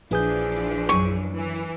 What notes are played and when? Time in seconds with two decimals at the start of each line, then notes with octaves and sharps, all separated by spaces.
0.11 A#1 E3 F3 D4 E4 G#4 B4 G6
0.89 F#2 G#5 C#6
1.32 E3